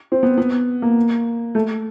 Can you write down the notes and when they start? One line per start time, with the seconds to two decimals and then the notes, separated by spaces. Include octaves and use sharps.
0.12 C4
0.23 B3
0.38 B3
0.82 A#3
1.55 A3